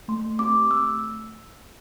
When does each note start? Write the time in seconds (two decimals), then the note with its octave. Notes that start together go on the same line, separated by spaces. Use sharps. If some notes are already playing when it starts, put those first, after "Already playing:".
0.08 A3 C6
0.39 C4 G4 D6
0.70 A3 E6